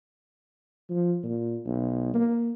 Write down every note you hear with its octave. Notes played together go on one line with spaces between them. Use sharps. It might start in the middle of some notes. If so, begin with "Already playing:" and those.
F3
A#2
B1
A#3